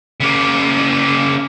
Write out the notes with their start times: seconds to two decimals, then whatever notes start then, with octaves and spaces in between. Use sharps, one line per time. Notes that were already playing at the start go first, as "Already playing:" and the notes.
0.20 C#3 A#3